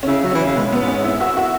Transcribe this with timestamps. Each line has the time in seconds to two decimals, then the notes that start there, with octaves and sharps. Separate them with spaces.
0.03 C#4
0.07 C#3 E4
0.24 F#3
0.31 E3 C#4
0.45 C#3
0.56 B2 G#3
0.72 B3
0.80 G#2
0.88 C#4
1.04 E4
1.21 F#4
1.37 F#4